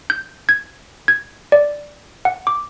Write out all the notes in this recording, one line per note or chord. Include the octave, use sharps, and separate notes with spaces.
G6
G#6
G#6
D5
F#5
D6